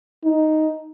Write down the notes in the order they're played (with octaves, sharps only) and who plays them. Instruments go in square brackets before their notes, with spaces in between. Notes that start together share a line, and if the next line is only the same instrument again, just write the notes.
[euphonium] D#4